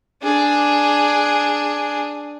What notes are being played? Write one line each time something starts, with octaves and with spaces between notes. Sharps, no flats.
D4 G#4